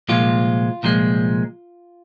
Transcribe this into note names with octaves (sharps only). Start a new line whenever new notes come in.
C2 A#2 F3 G#3 F4
C2 A#2 F3 G#3